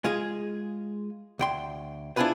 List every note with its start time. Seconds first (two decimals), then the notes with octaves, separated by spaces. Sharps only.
0.04 G#3 F4 G#4
1.39 D2 G5 C6
2.16 D4 E4 F4 G#4 B4 C5